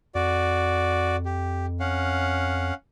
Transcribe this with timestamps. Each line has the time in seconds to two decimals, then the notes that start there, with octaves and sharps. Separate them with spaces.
0.15 F2 F#4 D5
1.25 G4
1.80 C#4 F5 F#5